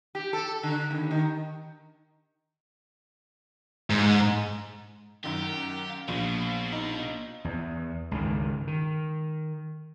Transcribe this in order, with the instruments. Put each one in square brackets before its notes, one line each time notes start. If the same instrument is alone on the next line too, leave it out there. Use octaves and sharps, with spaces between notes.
[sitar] G4
A4
D3
D#2
D#3
[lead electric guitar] G#2
[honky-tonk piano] F#2 D#3 [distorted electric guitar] G4
[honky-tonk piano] F5
[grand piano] A#1 [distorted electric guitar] B2
[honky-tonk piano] D#4
[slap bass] E2
C#2 G2 D#3
D#3